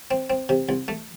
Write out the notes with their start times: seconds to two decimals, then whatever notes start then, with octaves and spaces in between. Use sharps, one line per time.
0.11 C4
0.30 C4
0.49 C3
0.69 C2
0.88 A3